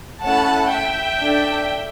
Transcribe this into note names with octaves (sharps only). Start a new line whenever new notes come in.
A3 C#4 E4 A4 F#5 A5
E5 G5
D4 A4